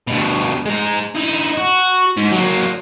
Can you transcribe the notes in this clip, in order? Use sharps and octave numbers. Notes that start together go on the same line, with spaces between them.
G2 B2
G#3 A#5
D#4 E4
F#4
G#2
F#3 A#3